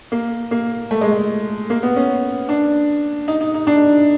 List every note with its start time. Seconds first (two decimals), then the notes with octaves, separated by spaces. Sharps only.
0.12 A#3
0.51 A#3
0.91 A3
1.01 G#3
1.13 A3
1.70 A#3
1.83 B3
1.96 C#4
2.49 D4
3.28 D#4
3.41 D#4
3.54 D#4
3.67 D4